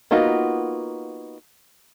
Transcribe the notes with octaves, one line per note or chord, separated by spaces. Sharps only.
A#3 B3 D#4 F4 F#4